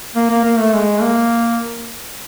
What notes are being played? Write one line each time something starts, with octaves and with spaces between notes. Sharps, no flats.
A#3
A#3
A#3
A3
G#3
A#3